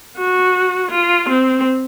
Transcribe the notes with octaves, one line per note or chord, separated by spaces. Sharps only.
F#4
F4
C4